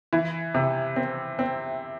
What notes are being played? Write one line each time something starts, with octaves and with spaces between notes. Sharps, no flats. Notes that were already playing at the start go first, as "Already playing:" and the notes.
E3
C3
C4
C4